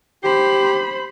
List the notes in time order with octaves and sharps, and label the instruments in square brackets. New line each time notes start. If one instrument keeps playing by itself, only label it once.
[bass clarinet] G4 [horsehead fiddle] C5 B5